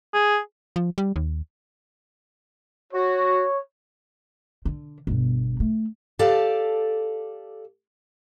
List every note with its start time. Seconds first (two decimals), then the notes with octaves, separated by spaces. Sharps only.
0.14 G#4
0.76 F3
0.98 G3
1.16 D#2
2.93 F#4 C#5
4.65 D3
5.07 G1 B2
5.60 A3
6.19 G4 A4 D5 F5